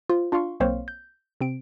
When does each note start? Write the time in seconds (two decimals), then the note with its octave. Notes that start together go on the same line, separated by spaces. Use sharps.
0.10 F4 C5
0.32 D4 F4 F5 C6 C#6
0.60 B1 A#3 C4 C5 C#5 F5
0.88 G6
1.41 C3 C4 D7